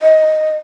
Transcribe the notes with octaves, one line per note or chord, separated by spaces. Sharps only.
D#5